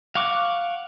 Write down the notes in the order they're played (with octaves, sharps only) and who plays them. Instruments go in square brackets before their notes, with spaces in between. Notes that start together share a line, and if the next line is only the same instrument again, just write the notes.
[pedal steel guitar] F5 F#5 C#6 D6